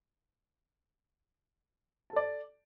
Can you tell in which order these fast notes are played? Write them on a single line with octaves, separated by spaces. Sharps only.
A5 A4 D5